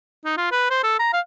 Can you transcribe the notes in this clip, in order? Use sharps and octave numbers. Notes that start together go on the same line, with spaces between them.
D#4
F4
B4
C5
A4
A#5
F5